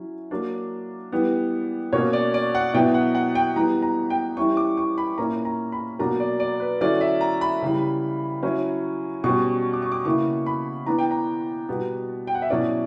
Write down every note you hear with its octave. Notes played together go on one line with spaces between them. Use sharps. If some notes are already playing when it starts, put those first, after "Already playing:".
Already playing: F#3 C#4 E4
F#3 A#3 D4
E3 G3 B3
B2 A#3 C#4 C#5
D5
D5
F#5
B2 F#3 B3 E4 G5
F#5
F#5
G5
E3 G3 B3 A#5
A#5
G5
E3 G3 C#4 E4 C#6
D6
C#6
B5
A#2 A#3 C#4 E4 A#5
A#5
B5
B2 F#3 A#3 D4 A#5
D5
D5
B4
D3 F#3 C#4 E4 D5
E5
A#5
B5
C#3 E3 G3
F#3 C#4 E4
B2 G3 C#4 C#6
D6
C#6
D6
C#3 E3 A#3 E4 C#6
B5
E3 B3 D4 A#5
G5
A#5
B2 G3 B3
G5
F#5
E5
B2 F#3 C#4 E4 D5